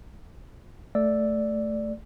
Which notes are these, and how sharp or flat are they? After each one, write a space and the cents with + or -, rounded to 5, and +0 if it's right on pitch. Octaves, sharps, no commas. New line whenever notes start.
A3 +0 D5 +0 E6 +0